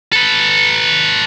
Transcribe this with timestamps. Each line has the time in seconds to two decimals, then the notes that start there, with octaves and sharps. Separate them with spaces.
0.13 A4 B4